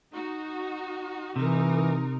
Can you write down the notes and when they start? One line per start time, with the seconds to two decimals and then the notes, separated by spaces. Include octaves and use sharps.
0.12 D#4 F#4
1.36 C3 E3 D#4 A#4